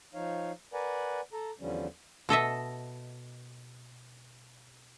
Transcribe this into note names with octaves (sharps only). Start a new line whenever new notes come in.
F3 D#4 C#5 F5
A#4 B4 D5 F#5 G#5
A4 A#5
E2 D3 F3 G3 C#4
B2 A4 D#5 E5